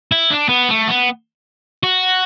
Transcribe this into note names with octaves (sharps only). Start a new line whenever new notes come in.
E4
D4
B3
A3
B3
F#4